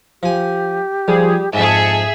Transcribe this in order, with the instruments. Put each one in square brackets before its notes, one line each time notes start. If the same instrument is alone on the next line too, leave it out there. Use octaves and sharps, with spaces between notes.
[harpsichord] F3 G#5 [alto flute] G4
[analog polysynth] F3 G#4 [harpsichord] G3
[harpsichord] F2 G#2 [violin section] G#4 E5 [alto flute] G#5 [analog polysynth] A5 C#7